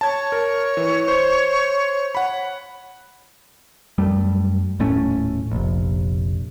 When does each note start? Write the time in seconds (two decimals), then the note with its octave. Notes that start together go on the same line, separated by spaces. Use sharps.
0.01 C#5 A5 G#6
0.32 A#4
0.77 E3
1.08 C5
2.15 F#5 B5
3.98 F#2 G3 A3
4.79 D#1 A2 A3 C#4
5.51 F1 A#1